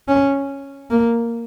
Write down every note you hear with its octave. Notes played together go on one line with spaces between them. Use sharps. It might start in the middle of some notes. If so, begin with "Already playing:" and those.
C#4
A#3